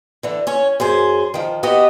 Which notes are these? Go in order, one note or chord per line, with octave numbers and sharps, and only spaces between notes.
D3 E3
C#4 C#5
F#2 G#4 C5
D#3 F3
B3 F#4 G4 D#5